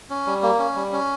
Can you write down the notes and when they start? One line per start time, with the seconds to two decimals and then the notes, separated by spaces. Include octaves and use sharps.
0.10 C#4
0.27 G3
0.43 A#3
0.59 C#4
0.75 G3
0.93 C#4